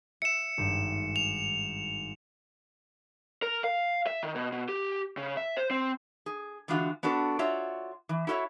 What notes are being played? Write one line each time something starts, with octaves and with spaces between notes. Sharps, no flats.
E5 C#7 E7
G#1 G2
F7
A#4
F5
E5
D#3
B2
B2
G4
C#3
E5
C5
C4
G#4
D3 E3 G#3 D4 F4 F#4
B3 D4 F#4 A4 B4
F4 F#4 C#5 D5 E5
E3
E4 F#4 A4 C#5 E5